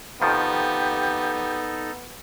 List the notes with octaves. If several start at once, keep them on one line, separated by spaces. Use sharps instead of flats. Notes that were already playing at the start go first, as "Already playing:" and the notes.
F2 D#3 F3 B3 D#4 G4 A4